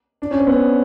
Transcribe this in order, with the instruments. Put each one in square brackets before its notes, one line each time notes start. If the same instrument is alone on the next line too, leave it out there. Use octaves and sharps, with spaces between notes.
[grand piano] D4
C#4
C4
B3